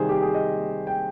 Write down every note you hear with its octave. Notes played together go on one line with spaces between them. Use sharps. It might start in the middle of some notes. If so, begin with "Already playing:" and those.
Already playing: C3 D#3 G3 G#4 C5
G4
G#4
D#5
G5